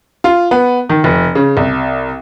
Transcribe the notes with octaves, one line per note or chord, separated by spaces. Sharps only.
F4
B3
D#3
F1
C#3
C2